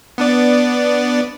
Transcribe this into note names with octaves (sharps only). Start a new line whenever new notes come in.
B3 D4 D5